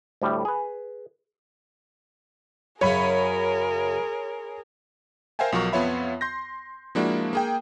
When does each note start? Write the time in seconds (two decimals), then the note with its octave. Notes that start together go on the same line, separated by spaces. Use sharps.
0.22 D2 A2 G3
0.45 G#4 B4
2.81 F#2 C#3 G#4 A#4 C#5 B5
5.39 A#4 C5 E5 F5 G5 G#5
5.52 B1 F3 F#3 A#4 C#6
5.72 F2 B3 F4 C#5 E5 B5
6.21 C6 G6 A#6
6.95 F3 G#3 A#3 D4 E4 F#4
7.33 A#3 G#4 G5